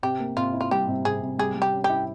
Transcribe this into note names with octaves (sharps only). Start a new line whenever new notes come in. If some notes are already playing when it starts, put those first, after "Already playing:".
C3 G4
A#3
C3 F4
E4
F4
G3 G4
C3
C3 G#4
C3
G3 G#4
G3
G4
C#4
G4
E4